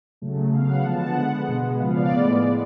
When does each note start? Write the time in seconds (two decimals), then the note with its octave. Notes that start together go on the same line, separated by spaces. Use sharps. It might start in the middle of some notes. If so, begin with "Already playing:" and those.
0.22 C#3 F#3 A3
0.53 C#3 F#3 B3 F5
0.69 F#5
0.85 D3 F3 G#3 B3 A5
1.01 F#5
1.17 D3 G#3 B3
1.48 B2 G#3 B3
1.80 C#3 F3 B3 F5
1.90 F5
1.97 D5
2.12 A2 G#3 B3
2.44 A2 G#3 B3